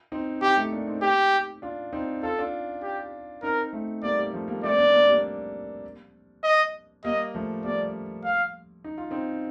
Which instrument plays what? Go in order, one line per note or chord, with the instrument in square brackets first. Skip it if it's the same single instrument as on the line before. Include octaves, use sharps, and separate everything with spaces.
[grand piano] C4 D#4
[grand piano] C4 D#4 [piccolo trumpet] G4
[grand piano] A3 C4
A#3 D4
C4 D#4
[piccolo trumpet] G4
[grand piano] D4 F4
C4 D#4
[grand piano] F4 [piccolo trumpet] A4
[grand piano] D4 F4
[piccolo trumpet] G4
[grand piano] C4 D#4 [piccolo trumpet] A#4
[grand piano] A3 C4
[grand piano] G3 A#3 [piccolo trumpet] D5
[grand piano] G3
F3 A3
G3 A#3
[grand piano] A3 C4 [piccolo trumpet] D5
[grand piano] A#3 D4
A#3 D4
G3 A#3
[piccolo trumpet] D#5
[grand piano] G3 A#3 [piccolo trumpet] D#5
[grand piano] F3 A3
[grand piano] G3 A#3 [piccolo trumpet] D5
[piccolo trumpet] F5
[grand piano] D#4
F4
C4 D#4